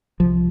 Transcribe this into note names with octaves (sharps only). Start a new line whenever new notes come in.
C2 C3 F3